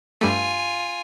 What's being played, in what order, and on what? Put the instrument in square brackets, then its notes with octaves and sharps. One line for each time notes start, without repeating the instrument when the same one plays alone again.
[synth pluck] G2 G3 A3 [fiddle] F4 G#5